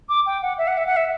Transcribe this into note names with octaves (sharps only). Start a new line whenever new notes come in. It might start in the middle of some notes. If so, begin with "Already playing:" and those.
D6
G5
F#5
E5
F#5
E5
F#5
E5